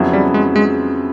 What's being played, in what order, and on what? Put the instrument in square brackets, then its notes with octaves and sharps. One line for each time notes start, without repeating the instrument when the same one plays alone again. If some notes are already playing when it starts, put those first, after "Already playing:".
Already playing: [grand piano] F2 C#3 F#3 B3 E4
[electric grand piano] G3
G#3
G#3